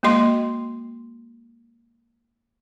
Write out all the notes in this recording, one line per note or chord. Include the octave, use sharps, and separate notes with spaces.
G#3 A#3 F#4 D#5 C6